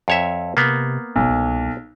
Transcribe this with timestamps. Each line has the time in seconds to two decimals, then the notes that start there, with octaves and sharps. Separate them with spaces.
0.08 F2 C#5 E5
0.57 C3 A#3 B3
1.16 F#1 B1
1.29 C2